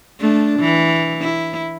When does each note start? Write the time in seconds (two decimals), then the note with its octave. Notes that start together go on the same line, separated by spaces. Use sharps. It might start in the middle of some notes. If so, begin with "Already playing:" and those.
0.20 A3 D4
0.59 E3
1.21 E4